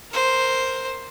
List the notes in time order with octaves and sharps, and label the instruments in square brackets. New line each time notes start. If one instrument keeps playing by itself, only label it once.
[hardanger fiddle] A#4 C5